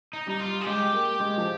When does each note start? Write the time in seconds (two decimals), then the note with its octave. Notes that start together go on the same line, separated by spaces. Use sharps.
0.13 D#4
0.27 G3 D#4
0.40 F4
0.61 G#4
0.66 G#3 G4
0.93 A#3
1.20 G#3
1.38 F3